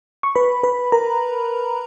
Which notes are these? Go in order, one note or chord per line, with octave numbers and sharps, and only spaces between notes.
C#6
B4 B5
B4 B5
A#4 A#5